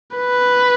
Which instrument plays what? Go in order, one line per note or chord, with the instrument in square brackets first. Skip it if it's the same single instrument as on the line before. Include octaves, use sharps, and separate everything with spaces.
[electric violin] B4